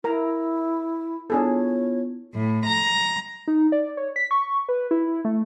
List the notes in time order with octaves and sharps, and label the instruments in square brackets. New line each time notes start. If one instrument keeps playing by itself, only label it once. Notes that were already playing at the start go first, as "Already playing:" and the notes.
[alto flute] E4 [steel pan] A#4 A#5
[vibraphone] B3 E4 F4 [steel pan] D4 G#4 A4 [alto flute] C#5
[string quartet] A2
A#5
[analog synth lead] D#4
D5
C#5
B6
C#6
B4
E4
A3